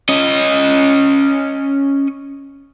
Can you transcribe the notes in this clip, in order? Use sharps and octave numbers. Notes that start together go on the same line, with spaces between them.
C#4 D#5